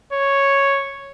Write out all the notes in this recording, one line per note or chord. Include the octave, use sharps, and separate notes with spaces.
C#5